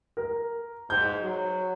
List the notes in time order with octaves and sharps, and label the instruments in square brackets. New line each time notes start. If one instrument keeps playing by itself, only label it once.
[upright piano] A#4
[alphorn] G#2 [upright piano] G6
[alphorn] F#3